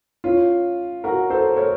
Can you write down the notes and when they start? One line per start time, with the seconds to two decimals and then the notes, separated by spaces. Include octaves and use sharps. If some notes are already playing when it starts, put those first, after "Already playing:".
0.24 C#4 F4
1.04 F#4 A#4
1.30 A4 C5
1.56 A#4 C#5